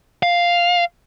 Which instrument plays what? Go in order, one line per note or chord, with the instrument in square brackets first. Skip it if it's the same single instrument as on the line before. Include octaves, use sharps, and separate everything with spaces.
[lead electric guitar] F5